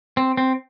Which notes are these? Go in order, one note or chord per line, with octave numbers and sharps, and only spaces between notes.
C4
C4